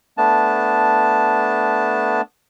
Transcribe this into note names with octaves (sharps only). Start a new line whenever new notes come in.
A3 B3 D4 A5